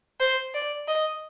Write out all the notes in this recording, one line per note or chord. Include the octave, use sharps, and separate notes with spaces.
C5
D5
D#5